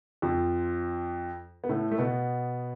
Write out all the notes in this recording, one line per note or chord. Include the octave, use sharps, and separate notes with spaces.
F2 F3
B3
A2 A3
A3
B2 B3